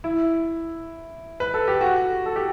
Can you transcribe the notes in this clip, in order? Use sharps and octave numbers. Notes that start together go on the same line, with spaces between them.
E4
B4
A4
G4
F#4
A4
G4